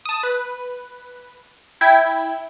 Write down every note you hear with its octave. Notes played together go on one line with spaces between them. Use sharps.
A5 D#6
B4
E4 G5 G#6